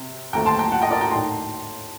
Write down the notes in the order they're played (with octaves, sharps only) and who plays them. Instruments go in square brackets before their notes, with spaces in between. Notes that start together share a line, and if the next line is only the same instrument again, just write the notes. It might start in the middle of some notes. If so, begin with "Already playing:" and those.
Already playing: [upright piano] C3 C4
D#2 D3 A3 C4 G5 A#5
A5 C6
G5 A#5
F#5 A5
D#5 G5
A#4 D5
G5 A#5
A2 A3 D#4 A5 C6